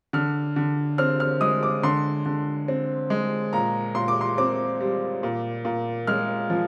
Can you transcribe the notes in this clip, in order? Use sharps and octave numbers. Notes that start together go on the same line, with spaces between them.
D3 F6
D3
C4 F6
F6
G#3 D#6
D6
D3 C6
D3
C4
G#3
A#2 A#5
A#2 C6
D6
C6
C4 D6
G3
A#2
A#2
G#3 F6
F3